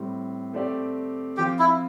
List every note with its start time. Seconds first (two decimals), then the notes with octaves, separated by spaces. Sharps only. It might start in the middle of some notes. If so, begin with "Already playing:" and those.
Already playing: A2 G3 C4
0.53 A3 C4 G4 D5
1.37 F3 C4 F4 G4
1.59 E4